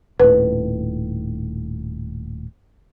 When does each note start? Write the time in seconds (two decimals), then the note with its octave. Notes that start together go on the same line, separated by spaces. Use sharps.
0.20 D#1 A2 B4